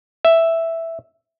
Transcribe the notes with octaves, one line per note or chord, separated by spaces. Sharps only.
E5